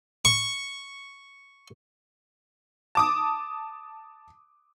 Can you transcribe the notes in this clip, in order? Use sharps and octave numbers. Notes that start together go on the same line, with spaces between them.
C#6
A5 D6 D#6